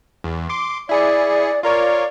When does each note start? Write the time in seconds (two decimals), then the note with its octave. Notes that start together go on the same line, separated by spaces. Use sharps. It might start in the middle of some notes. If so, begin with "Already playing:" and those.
0.24 E2
0.49 C6 D6
0.89 E4 G#4 D5 C#7
1.63 F4 A#4 C#5 D5